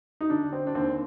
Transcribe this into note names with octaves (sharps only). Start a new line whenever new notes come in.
D#4
D3 D4
C4
D4
D#2 C4